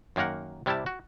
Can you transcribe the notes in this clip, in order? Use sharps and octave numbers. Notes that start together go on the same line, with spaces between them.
F#2 D#3 A#3 A#4 F#5
C3 G3 E4 G4 A5
F#4